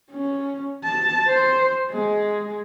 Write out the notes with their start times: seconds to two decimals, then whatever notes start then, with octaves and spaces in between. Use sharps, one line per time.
0.11 C#4
0.84 A5
1.28 C5
1.91 G#3